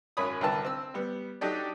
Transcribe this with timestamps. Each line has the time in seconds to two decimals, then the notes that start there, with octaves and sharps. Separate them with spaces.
0.17 G#1 F#2 C#5 B5 D#6
0.41 C2 D3 A#4 B4 A5
0.65 C4 E6
0.94 G3 B3
1.41 F#3 D4 D#4 G4 A4 D5